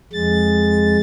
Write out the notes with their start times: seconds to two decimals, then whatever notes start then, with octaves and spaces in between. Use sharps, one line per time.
0.13 F2 G#3 A6